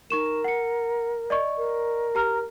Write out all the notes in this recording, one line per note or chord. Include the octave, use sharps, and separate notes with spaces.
D#4 A#4 C#6 E7
F#5 C#7
D5 D#5 C#6
A#4
G4 A#5 F6